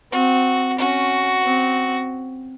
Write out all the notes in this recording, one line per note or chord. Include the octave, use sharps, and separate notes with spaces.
C4 F#4
C#4 F#4
C4